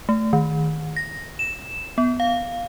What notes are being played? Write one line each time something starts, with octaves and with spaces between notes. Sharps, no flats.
A3
D#3
A#6
E7
B3
F5